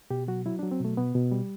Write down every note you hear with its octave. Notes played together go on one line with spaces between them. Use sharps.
B2 G4
F#3 F#4
F#3 E4
F#3 D4
C4
B2 A3
B2 B3
B2
G3